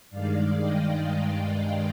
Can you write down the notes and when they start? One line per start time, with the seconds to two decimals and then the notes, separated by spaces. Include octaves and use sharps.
0.10 G2 D#3 G#3 D5 F5
0.60 D#5 G5
1.09 D5 F5
1.58 D5 F5